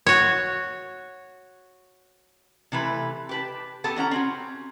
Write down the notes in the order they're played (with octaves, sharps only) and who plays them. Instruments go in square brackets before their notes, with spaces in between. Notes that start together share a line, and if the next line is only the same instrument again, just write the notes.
[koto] F#4 C#5
[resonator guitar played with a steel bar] C3 E3 A3 B4
G4 B4 A5
B3 G4 A4 A5
E3 C#4 F#5 A#5
C4 C#4 F#4